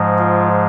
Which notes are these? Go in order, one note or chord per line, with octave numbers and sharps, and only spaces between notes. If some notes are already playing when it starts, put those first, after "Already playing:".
Already playing: G#2 F3 G#3
F4